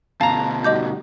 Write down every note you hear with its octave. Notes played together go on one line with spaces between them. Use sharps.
D2 B2 F5 A5 A#5
G3 D#4 F#4 D#5 D6 G6